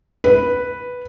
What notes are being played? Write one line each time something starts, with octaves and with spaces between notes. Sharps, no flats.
B4